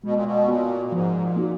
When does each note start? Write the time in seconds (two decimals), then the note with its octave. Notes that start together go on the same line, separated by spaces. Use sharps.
0.04 B2 G#3
0.14 A#2
0.24 B2
0.48 A#2 B3 F#4
0.85 A#2
0.92 G#2 F3
1.21 A#2
1.36 A#3 D#4 F#4